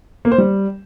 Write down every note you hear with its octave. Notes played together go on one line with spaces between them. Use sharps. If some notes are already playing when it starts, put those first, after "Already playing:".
A#3
C5
G3